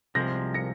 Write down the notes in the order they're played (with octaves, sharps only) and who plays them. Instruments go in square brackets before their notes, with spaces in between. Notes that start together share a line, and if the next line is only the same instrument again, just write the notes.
[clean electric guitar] C2 C3 F3 G#3 [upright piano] G6 A#6
[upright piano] A#6 C#7